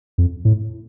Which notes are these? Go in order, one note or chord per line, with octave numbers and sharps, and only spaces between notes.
F2
A2